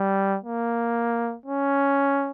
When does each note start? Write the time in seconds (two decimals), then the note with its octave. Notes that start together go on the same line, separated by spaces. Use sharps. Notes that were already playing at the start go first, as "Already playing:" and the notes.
Already playing: G3
0.44 A#3
1.46 C#4